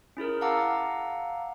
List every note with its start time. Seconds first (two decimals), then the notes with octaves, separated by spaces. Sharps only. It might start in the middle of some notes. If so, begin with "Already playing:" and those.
0.17 C#4 E4 G#4 A#4
0.41 F5 F#5 A5 A#5 D6 E6